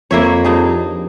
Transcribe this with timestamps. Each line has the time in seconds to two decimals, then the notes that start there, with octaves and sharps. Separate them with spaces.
0.11 F2 A#3 E4 C#5
0.44 G2 D#4 G#4